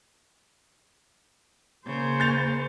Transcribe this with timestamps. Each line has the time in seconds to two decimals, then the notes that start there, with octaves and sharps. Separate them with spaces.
1.86 C#3 A#3 C5
2.20 G6 A6 F7